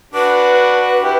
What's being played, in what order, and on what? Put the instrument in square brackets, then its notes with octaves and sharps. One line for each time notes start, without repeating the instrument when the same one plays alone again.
[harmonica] D4 F#4 [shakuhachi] B4
[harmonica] E4 G4